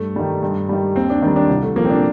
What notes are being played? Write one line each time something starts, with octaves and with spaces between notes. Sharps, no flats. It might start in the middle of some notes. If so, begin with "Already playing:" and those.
Already playing: G2 A3
D#3 G3
G2
D#3 G3
D#2 C4
D4
D#3 G3
D4
C2
A3
A#2 F3 A#3
C4
D4